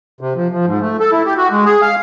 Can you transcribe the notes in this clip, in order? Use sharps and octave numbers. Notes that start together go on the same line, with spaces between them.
C3
F3
F3
G#2
A3
A4
E4
G4
F#4
G#3
G#4
F5